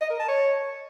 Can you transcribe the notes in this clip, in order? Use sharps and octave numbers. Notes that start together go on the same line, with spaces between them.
D#5
A#4
A5
C#5